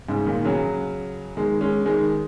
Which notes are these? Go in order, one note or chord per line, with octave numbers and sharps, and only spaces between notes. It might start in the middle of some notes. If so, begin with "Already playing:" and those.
G#2 C#3
A#2 D#3
C#3 F#3
D#3 G#3
G#3 C#4
D#3 G#3